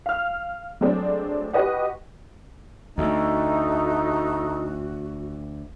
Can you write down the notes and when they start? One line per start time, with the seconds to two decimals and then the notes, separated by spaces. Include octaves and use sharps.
0.06 F5 F6
0.81 F#3 G#3 A3 C4 D4
1.53 F#4 G4 B4 D#5 F#5
2.98 D2 A3 D#4 F#4